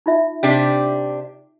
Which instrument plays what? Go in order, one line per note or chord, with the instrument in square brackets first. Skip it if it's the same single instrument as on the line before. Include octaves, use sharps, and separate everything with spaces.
[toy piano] D#4 F4 E5
[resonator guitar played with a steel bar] C3 D4 G4